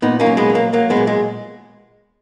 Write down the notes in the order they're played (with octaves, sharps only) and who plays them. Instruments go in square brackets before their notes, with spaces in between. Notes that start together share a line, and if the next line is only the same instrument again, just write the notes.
[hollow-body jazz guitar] A#2 B3 D#4
A#3 C#4
F#3
G#3 B3
F#3
A#3
F#3 A#3
G#3 B3
A#2
G#3